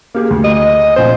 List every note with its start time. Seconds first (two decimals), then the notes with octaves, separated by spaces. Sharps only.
0.15 A#3 G4 G#4
0.31 D2
0.44 D#5
0.96 A#1 C4 C5